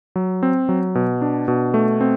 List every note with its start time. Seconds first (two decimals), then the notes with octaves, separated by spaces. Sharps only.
0.16 F#3
0.43 C4
0.69 F#3
0.95 B2
1.22 D4
1.48 B2
1.74 A3
2.01 C4